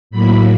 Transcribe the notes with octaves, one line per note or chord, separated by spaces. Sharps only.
A2 F#3 A#3 B5